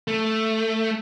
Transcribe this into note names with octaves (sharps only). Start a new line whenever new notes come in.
A3